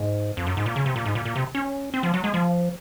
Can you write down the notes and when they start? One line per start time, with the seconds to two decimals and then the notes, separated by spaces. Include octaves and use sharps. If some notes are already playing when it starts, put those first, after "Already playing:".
Already playing: G#2
0.37 F2
0.47 F#2
0.57 G#2
0.66 A#2
0.76 C#3
0.86 C3
0.96 A#2
1.05 G#2
1.15 A#2
1.25 A#2
1.36 C3
1.55 C#4
1.94 C4
2.03 F3
2.14 F#3
2.24 G#3
2.34 F3